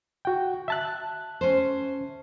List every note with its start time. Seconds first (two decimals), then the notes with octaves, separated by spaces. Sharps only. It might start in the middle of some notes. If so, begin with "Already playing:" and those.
0.25 F#4 G5
0.68 E5 A5 F#6
1.41 C#4 C5